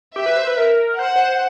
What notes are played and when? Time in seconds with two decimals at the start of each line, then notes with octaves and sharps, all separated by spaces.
0.16 G4 E5
0.26 B4
0.37 C5
0.47 B4
0.57 A#4
0.98 C5 F#5
1.16 C5